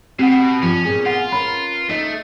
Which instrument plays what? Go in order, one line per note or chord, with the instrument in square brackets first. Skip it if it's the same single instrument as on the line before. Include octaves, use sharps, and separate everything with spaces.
[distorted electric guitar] B2 [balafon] C4 F#5 [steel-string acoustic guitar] G4
[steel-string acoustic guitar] G2 F3 [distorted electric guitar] C#4
[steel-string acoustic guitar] A#2 B3 G#4
[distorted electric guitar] F4 [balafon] F#5
[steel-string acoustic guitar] C#4 A#4 B4 [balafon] B5
[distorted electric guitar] A3 [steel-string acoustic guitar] D#4 D#5